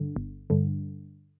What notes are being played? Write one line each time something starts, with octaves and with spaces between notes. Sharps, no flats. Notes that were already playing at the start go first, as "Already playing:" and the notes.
Already playing: G2 D3
G1
G2 D3